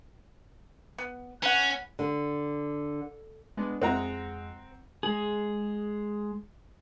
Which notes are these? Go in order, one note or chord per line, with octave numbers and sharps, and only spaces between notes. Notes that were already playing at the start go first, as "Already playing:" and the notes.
B3
C#4 B4 F#5
D3
G#3 B3 D4
F2 G#3 C4 F#5 A#5
G#3 G#4